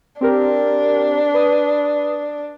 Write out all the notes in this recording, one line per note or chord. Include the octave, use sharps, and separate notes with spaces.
C4 D4 G4 A#4
B4 D#6